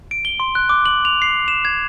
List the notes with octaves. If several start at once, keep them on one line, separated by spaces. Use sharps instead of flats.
D7
G7
C6
F#6
D6
F#7
F7
C7
E7
G#6